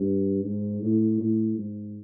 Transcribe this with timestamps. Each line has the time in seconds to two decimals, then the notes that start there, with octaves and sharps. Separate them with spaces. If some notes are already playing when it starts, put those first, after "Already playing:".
Already playing: G2
0.44 G#2
0.82 A2
1.20 A2
1.58 G#2